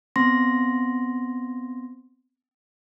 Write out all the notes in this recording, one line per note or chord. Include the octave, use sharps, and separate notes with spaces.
B3 C4 C6 A#6